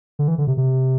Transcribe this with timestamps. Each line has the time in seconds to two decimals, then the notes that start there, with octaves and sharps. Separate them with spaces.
0.19 D3
0.28 E3
0.38 D3
0.47 C3
0.57 C3